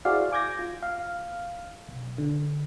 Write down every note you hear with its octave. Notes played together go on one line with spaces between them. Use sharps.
E4 F#4 G#4 C5 D5 F5
G#5 D6 G6 G#6 A#6
F4
F5
B1
D3